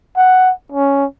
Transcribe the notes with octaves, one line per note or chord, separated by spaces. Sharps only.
F#5
C#4